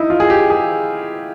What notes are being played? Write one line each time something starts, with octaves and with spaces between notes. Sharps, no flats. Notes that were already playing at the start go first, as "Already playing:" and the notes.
Already playing: D#4 E4
F4
G#4
G4
G#4